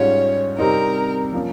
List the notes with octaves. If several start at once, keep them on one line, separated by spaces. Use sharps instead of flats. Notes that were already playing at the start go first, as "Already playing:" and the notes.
Already playing: G#2 G3 C#4 F4 C#5
C3 G3 C4 D#4 A#4
F3 A#3 C#4